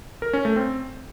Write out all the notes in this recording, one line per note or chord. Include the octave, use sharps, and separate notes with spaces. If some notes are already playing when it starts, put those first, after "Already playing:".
A#4
C#4
A3
C4